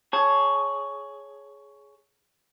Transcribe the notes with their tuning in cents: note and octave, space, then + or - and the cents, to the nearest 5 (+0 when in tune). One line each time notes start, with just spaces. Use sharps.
G#4 +10 C#5 +5 A5 -10